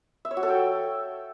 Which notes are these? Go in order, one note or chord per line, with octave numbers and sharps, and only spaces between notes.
E5
C#5
F#4
A4
G5